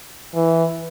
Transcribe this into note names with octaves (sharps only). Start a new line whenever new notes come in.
E3